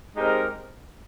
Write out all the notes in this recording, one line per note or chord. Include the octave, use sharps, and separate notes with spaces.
G#3 C4 D#4 G4 A#4